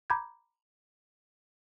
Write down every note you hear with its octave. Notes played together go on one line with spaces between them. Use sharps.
A#5 B5 D6 G6 G#6